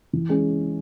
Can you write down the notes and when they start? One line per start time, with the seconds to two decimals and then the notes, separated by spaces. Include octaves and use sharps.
0.13 E3
0.29 G#3 C#4 G#4